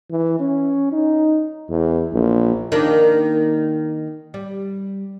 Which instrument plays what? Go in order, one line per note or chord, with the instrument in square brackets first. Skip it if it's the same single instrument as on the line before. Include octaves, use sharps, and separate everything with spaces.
[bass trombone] E3
C#4
D#4
E2
A#1
[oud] D#3 A#3 D4
G3